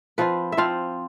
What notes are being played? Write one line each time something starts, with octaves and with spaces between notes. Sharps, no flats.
F3 C4 F4 B4
E5
F3 C4 F4 F5